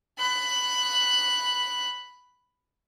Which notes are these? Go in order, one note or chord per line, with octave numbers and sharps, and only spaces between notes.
B5 F#6